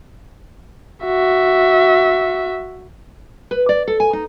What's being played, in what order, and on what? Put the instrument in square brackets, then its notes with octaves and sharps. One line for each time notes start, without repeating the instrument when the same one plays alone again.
[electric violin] F#4 E5
[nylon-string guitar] B4
D5
A4
G#5
D#4